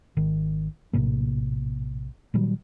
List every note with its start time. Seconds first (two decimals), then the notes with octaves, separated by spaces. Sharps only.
0.17 G#1 D#3
0.93 A#1 A2 C3 A#3
2.34 A#2 D#3 F#3 G3